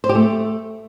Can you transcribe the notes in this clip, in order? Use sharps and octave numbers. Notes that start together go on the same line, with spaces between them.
C5
G4
A3